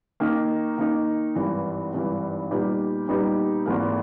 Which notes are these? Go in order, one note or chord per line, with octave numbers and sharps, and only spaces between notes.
D#3 A#3 D#4
D#3 A#3 D#4
G#1 G2 E3
G#1 G2 E3
A#2 G3 B3 D#4 G4
A#2 G3 B3 D#4 G4
G#1 G#2 E3 A#3